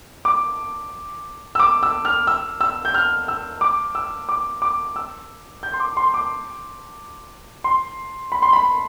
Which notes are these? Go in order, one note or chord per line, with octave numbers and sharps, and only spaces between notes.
D6
E6
D6
E6
F6
E6
E6
G6
F6
E6
D6
E6
D6
D6
E6
G6
C6
D6
C6
D6
C6
B5
C6
B5